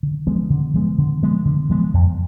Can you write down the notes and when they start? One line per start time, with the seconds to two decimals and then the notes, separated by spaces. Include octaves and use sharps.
0.03 D3
0.27 F3 G#3 B3
0.50 D3
0.74 F3 G#3 B3
0.98 D3
1.22 F3 G#3 B3
1.45 D3
1.69 F3 G#3 B3
1.94 F2